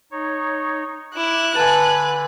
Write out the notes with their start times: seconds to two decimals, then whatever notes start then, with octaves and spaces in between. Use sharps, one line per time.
0.12 D#4 C#5
1.16 E4 D6 F#6
1.55 D3 B4 G#5 A5